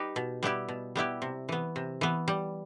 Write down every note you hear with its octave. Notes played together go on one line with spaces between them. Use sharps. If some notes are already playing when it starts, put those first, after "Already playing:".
Already playing: G3 D#4 G4 B4
B2
G3 B3 E4 G4
B2
G3 B3 E4 G4
C3
E3 B3
C3
E3 B3
G3